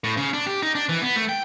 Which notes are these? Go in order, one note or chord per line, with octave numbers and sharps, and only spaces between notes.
A2
C#3
D4
G4
D#4
D4
E3
B3
A3
G5